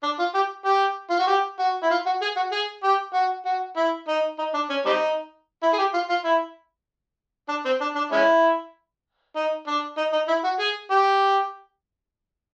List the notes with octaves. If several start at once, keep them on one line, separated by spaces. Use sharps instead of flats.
D4
F4
G4
G4
F4
F#4
G4
F#4
E4
F4
F#4
G#4
F#4
G#4
G4
F#4
F#4
E4
D#4
D#4
D4
C#4
G3 C4 D#4
E4
G#4
G4
F4
F4
E4
D4
C4
D4
D4
G#3 C#4 E4
D#4
D4
D#4
D#4
E4
F#4
G#4
G4